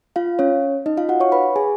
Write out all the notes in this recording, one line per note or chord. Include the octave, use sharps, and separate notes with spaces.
F4 F5
C#4 C#5
D#4 D#5
F4 F5
F#4 F#5
C#5 C#6
B4 B5
G#4 G#5